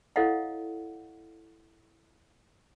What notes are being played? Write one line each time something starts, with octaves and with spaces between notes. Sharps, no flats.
E4 A4 C#5 D#5 F5 F#5